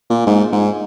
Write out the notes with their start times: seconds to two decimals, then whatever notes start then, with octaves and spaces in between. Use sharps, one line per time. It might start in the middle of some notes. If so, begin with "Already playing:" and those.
0.10 A#2
0.27 G#2
0.52 G#2